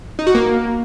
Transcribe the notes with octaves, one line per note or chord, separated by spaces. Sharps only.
D#4
F#4
A#3